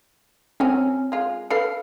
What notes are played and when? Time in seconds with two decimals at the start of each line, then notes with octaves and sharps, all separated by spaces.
0.60 F#3 C4 C#4
1.12 G#3 F4
1.50 A4 B4 F5 C7